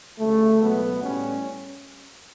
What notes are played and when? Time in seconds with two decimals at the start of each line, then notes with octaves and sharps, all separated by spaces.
0.18 D2 C#3 G3 A3
0.60 C#2 B2 F#3 A3 B3
1.01 A2 G3 C#4